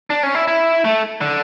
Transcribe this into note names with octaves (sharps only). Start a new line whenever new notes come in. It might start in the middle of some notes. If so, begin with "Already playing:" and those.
D4
C#4
E4
E4
A3
D3